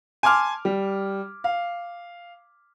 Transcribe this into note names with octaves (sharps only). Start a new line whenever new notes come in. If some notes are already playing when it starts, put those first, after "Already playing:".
G#5 A5 C6 D6 F6
G3
F5